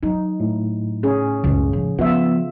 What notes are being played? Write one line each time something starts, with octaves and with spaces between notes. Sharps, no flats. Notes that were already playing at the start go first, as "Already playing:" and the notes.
F#3 D#4
A2
C#4 G#4
C#2 F#2 C#3
F3
F3 B3 F4 E5